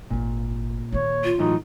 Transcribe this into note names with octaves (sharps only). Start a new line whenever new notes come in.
G#1 A#2 A#3
D#3 A#3 C#5
F4
A2 E3 F#3 D#4